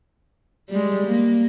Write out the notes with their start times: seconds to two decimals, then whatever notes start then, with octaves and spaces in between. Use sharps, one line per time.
0.69 G3 G#3
1.07 A#3